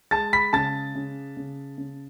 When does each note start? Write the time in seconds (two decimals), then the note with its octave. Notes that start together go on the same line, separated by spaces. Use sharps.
0.11 G#3 A5 A6
0.33 B5 B6
0.53 C#3 A5 A6
0.95 C#3
1.37 C#3
1.78 C#3